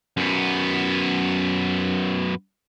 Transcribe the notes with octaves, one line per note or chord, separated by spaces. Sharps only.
F#2 B3